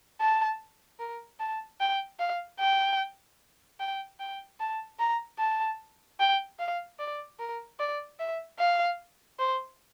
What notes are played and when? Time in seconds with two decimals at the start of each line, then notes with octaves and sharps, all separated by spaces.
0.20 A5
0.99 A#4
1.40 A5
1.80 G5
2.20 F5
2.60 G5
3.80 G5
4.20 G5
4.60 A5
4.99 A#5
5.39 A5
6.20 G5
6.59 F5
6.99 D5
7.39 A#4
7.79 D5
8.19 E5
8.59 F5
9.39 C5